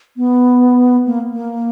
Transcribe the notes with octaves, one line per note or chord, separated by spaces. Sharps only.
B3
A#3
A#3